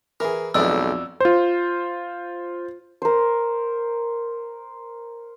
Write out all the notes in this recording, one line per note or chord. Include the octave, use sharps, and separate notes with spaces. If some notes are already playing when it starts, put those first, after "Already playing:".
E3 G#4 A#4
B1 F2 A2 E3 G#3 D5 E6
F4 C5
A#4 C5